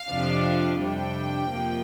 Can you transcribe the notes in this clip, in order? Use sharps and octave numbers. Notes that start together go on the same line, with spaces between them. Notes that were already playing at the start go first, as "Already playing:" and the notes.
Already playing: F5
F2 C3 F3 D4
F2 C3 G3 D4 G5
F2 C3 F3 A#3